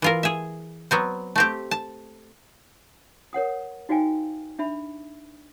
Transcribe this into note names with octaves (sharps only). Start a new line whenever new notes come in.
E3 F4 A#4
G#4 E5
F#3 B3 C4
A3 C4 G4
A5
A#4 C#5 F#5 D#6
D#4 F#4 D5 F5 G5 G#5
D4 E5 B5